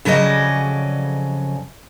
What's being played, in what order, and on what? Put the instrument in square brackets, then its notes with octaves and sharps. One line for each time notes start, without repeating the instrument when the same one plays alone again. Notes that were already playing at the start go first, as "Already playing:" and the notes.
[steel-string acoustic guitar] F2 C#3 F#3 G#4 D5 D#5